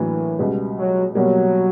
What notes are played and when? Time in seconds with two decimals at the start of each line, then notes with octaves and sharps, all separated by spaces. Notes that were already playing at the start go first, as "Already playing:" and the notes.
Already playing: A2 E3 F#3 A#3 D4
0.39 C#2 B2 G3 B3
0.77 F#3
1.15 B2 F#3 G3 A#3